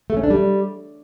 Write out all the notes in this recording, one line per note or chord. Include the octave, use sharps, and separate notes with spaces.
A3
C#4
D4
G3